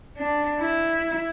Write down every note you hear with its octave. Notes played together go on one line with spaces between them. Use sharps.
D4
E4